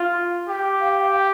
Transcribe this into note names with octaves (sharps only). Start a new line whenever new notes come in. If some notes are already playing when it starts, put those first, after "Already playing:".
Already playing: F4
G4 G5
F5
G5
F5
G5